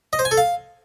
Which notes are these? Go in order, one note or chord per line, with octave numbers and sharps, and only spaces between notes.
D#5
C5
G#5
A4
F5